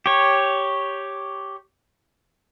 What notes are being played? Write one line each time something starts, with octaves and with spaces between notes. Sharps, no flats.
G4 C#5